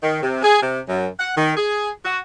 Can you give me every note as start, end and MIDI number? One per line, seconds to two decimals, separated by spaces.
0.02 0.18 51
0.22 0.40 48
0.43 0.61 68
0.62 0.80 48
0.87 1.07 42
1.19 1.32 78
1.35 1.51 51
1.57 1.89 68
2.04 2.19 66